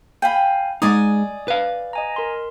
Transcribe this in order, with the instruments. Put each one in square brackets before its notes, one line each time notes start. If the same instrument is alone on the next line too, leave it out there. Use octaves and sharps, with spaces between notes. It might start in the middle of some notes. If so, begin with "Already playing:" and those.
[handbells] F5 G#5 [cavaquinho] G5 B5
[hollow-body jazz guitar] G#3 D#4 [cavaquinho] D5 D#5 G#5 [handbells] D#6
[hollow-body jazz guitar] B4 F5
[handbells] D#5 G#5 A#5
A#4 C6